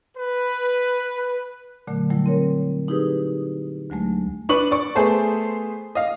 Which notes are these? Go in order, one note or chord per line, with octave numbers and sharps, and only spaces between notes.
B4
A#2 D3 F#3 A3
F#3 G3 A3 E4
C4 A#4 C#5
D#4 E4 G4 G#4 B4 D#6
D2 F#3 G#3 A3
D4 B4 C#6 F#7
D5 C#6
A3 B3 G#4 C5 A5
D#5 F5